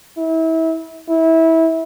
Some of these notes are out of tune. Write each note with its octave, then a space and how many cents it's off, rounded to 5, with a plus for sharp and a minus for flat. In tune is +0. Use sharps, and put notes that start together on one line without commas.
E4 -30
E4 -20